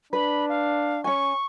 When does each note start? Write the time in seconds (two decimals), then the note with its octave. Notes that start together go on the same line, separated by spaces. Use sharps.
0.13 D4 B4 B5
0.49 F5
1.04 C#4 G#5 C#6